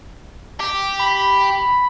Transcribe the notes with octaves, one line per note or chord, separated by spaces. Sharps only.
G4
B5